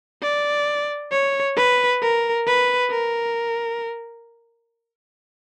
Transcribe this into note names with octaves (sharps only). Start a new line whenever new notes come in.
D5
C#5
B4
A#4
B4
A#4